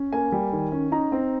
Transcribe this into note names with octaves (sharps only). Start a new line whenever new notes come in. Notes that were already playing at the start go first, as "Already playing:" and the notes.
Already playing: C#4
A#3 G#5
G3
D#3
C#4
D#4 A#5
C4